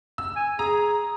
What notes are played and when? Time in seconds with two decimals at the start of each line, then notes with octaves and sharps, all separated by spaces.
0.18 E6
0.36 G#5
0.59 G#4 A#5